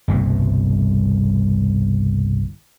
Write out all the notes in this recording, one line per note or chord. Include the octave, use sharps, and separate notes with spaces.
G1 C2 B2